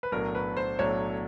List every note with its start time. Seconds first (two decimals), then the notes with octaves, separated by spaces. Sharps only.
0.03 B4
0.12 B1 A2 F#3 A3 D4 A#4
0.35 B4
0.57 C5
0.79 B1 A2 F#3 A3 D4 C#5